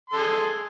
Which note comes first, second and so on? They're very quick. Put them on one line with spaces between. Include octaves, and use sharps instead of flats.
C6 A4 G#4